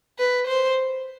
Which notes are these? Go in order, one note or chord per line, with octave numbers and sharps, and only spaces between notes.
B4
C5